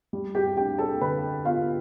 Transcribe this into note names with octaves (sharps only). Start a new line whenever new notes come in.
G3
G4 G5
D4 G4 G5
A4 A5
D3 B4 B5
B3 F4 F5